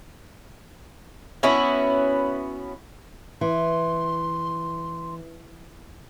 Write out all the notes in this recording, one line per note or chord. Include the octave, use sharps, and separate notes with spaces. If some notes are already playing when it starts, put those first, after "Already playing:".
B3 C#4 E4 F#4
E3 C6